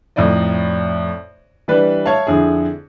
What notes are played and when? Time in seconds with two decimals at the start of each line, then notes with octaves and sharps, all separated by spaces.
0.16 F2 A2 D#4 D5 D#5
1.68 E3 G3 D4 B4
2.06 C#5 E5 F5 A5
2.27 F2 D3 E4 G#4